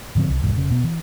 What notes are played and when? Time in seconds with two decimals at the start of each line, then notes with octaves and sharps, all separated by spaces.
0.15 G#2 D3 F3 C4
0.29 C2
0.42 C2 F2 G#2 E3
0.57 F1 C#3
0.71 B2 B3
0.84 E3